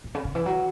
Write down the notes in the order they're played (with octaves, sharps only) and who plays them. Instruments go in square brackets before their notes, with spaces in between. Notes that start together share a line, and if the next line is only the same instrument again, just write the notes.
[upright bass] A2
C#3
C#3
E3
F#3